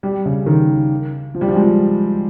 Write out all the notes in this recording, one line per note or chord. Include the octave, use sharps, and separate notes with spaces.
G3
C#3
D#3
F3
G3
F3
G#3